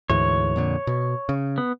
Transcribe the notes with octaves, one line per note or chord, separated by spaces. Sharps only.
D2 G#2 E3 C#5
F2 A#2 D3
B2
C#3
B3